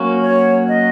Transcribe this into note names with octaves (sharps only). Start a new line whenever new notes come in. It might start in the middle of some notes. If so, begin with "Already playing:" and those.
Already playing: F#3 A#3 C#4 F#4
C#5
D#5